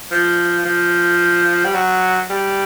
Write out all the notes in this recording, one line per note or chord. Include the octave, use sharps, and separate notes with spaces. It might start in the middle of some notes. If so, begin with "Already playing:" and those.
F3
F3
G3
F#3
G3